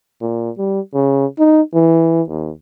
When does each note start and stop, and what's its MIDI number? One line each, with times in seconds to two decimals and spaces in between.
0.22 0.50 46
0.58 0.80 55
0.94 1.26 49
1.39 1.62 63
1.74 2.22 52
2.29 2.51 39